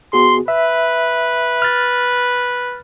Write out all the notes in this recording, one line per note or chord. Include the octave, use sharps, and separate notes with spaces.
B3 F#4 G#4 C6
B4 E5
F6 A6